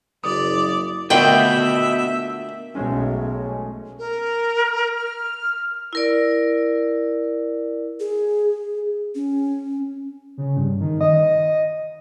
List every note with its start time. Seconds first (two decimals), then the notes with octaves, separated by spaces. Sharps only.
0.24 F#1 D5 D#6
1.10 A#2 D3 A3 B3 F#4 D#5 E5 G5
2.75 B1 G#3 A3 C#4
3.99 A#4
4.95 F6
5.93 E4 A#4 D5
8.00 G#4
9.15 C#4
10.37 C#3
10.57 G2
10.80 D#3
11.01 D#5